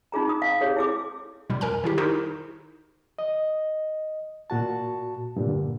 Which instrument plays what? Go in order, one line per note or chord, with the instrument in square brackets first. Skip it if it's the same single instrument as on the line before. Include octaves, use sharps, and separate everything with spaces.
[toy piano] D#4 F4 G#4 A#5
D#6
F5
G4 G#4 C#5
E4 G#4 D6
[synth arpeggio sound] B2 G3
F2 A#4 G#5 A#5
D#3 E4 G4
D#4 E4 F#4 G4 A#4 C5
[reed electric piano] D#5
A#2 F#4 A5
G2 A#2 D3